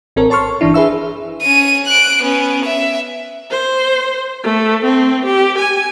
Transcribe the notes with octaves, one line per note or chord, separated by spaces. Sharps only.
A1 C4 A4 A#4 C#5
C#5 A5 C6 C#6 F6
G1 E3 D4 E4
G#4 B4 E5 E6
C#4 D#7
F#6 D7
B3 C#4
E5
C5
A3
C4
G4
G#5